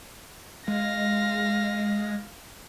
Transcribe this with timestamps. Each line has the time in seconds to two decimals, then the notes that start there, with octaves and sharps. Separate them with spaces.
0.68 G#3 F5 A#6